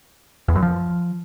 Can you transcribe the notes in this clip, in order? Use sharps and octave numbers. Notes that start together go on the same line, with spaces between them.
E2
F#2
F3